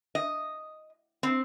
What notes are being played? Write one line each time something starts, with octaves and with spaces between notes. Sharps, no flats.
D#5
C4